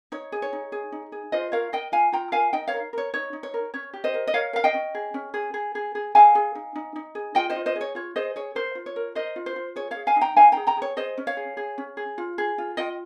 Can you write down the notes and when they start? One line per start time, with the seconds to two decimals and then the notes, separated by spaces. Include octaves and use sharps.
0.12 D#4 C#5
0.32 G#4
0.42 C#5
0.53 D#4
0.72 G#4
0.92 D#4
1.12 G#4
1.32 F4 C5 D#5
1.52 A#4 C#5 F5
1.72 A#4 D#5 G5
1.92 F4 F5 G#5
2.12 F4 G5 A#5
2.32 A#4 F5 G#5
2.53 D#4 D#5 G5
2.67 C#5 F5
2.74 A#4
2.93 A#4 C#5
3.14 D#4 C#5
3.33 D#4
3.43 C#5
3.54 A#4
3.74 C#4 C#5
3.93 G4
4.04 C5 D#5
4.14 A#4
4.27 D#5
4.34 A#4 C#5 F5
4.53 A#4 F5
4.64 D#5 G5
4.74 C#4
4.95 G#4
5.14 C#4
5.34 G#4
5.54 G#4
5.75 G#4
5.95 G#4
6.15 G#4 F5 G#5
6.35 G#4
6.55 D#4
6.76 D#4
6.96 D#4
7.15 G#4
7.35 F4 D#5 G5
7.50 C5 D#5
7.56 F4
7.66 C5 D#5
7.76 G#4
7.81 C#5
7.95 F4 C#5
8.16 G#4 C5 D#5
8.36 G#4 C#5
8.55 A#4 C5
8.75 F4
8.86 C#5
8.96 A#4
9.15 A#4 C5 D#5
9.36 F4
9.46 C5
9.56 F4
9.76 G#4 C#5
9.91 C#5 F5
9.97 G#4
10.07 F5 G#5
10.16 D#4
10.21 G5 A#5
10.36 D#4 F5 G#5
10.52 G#4 G5 A#5
10.67 G5 A#5
10.77 G#4 C#5
10.97 G#4 C5 D#5
11.18 C#4
11.27 C#5 F5
11.37 G#4
11.57 G#4
11.78 C#4
11.97 G#4
12.18 F4
12.38 G#4
12.58 F4
12.77 F4 D#5 G5